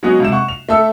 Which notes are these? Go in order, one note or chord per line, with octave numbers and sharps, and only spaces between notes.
F#3 G#3 B3 C#4 F#4 D#5
G#2 C3 E7
F#5 C#6
F7
A3 A4 E6